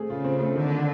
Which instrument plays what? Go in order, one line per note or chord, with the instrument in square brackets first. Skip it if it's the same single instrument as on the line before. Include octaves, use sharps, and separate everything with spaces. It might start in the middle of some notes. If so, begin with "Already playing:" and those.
Already playing: [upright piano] A3 C4 G#4
[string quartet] C#3 [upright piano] F4
[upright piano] C4
A3
[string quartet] D3 [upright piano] D#3